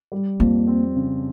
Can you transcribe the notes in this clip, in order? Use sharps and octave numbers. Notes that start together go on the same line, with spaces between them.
G3
F2 A#3
C4
C#3